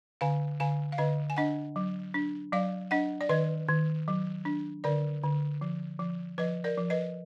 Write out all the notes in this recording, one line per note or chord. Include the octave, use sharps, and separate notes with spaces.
D3 F5 G#5
D3 F5 G#5
F5
D3 B4 D#5
G#5
D4 D#5 F#5
F#3
D4
F#3 D5 F5
D4 D#5 F#5
D5
D#3 B4 D#5
D#3
F#3
D4
D3 A#4 D5
D3
F3
F3
F3 B4 D#5
A#4 D5
F3
B4 D#5